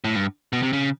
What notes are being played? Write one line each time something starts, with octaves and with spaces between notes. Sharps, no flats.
A2
G2
B2
C3
C#3